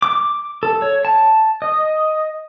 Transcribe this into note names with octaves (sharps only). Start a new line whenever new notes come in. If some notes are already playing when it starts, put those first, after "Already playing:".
D6
A4
C#5
A5
D#5